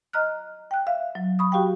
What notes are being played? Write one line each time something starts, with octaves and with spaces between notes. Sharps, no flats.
D#5 A#5 F6 F#6
G5 F#6
E5 F5
F#3
B5 C#6 D#6
F#4 G4 F5 G5